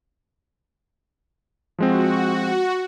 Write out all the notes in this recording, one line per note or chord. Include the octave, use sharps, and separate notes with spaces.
F3 G#3 C4 F#4